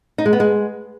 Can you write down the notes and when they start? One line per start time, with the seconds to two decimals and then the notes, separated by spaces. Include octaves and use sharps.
0.18 D#4
0.26 G#3
0.33 B3
0.40 G#3